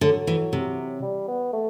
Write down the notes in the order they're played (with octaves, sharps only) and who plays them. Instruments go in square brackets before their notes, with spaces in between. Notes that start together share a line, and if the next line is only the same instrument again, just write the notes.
[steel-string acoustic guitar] D3 [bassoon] F#3
[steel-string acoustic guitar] E3
C3
[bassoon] G3
B3
A3